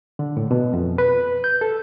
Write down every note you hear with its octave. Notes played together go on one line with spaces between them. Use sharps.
D3
A2
B2
F2
B4
G6
A4